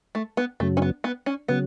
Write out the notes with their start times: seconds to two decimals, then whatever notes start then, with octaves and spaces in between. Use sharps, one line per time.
0.15 A3
0.37 B3
0.60 F#2 C#3 F#3 A3
0.77 C#4
0.82 B3
1.04 B3
1.26 C#4
1.48 C#3 F#3 B3